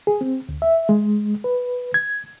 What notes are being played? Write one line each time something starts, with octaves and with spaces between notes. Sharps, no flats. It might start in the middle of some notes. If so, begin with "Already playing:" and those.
G#4
C4
D2
E5
G#3
B4
G#6